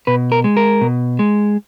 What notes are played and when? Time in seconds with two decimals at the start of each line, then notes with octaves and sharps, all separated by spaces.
0.07 B2 B4
0.32 A#4
0.44 G#3
0.57 A#4
0.81 B2
1.19 G#3